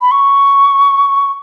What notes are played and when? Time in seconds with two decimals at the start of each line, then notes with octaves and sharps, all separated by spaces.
0.02 B5
0.11 C#6